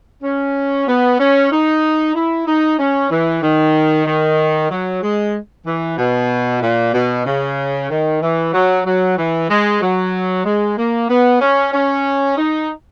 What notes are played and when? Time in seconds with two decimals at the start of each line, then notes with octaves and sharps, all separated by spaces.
0.23 C#4
0.88 B3
1.19 C#4
1.51 D#4
2.15 E4
2.47 D#4
2.79 C#4
3.11 E3
3.42 D#3
4.07 D#3
4.70 F#3
5.02 G#3
5.66 E3
5.98 B2
6.62 A#2
6.94 B2
7.26 C#3
7.90 D#3
8.22 E3
8.53 F#3
8.85 F#3
9.17 E3
9.49 G#3
9.81 F#3
10.45 G#3
10.77 A#3
11.09 B3
11.41 C#4
11.73 C#4
12.37 D#4